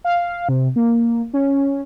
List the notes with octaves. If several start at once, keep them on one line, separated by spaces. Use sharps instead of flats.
F5
C3
A#3
C#4